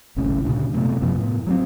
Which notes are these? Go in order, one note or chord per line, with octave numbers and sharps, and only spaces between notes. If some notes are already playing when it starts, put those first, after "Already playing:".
G1 C2 A2 C#4
D2 G2 A#2 C#3
F#2 C3 A3 B3
F#2 C3 F3 B3
A2 B3
F#3 A3 C4